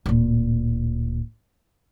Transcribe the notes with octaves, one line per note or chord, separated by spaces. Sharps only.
D1 A#2